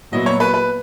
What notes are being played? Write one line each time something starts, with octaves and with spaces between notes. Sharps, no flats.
A#2 F#3 B3 E4 D#5
C#5
B4
B4